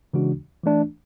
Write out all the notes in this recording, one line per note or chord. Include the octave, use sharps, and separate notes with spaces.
C#3 E3 G#3 D4 F#4
E3 A3 D4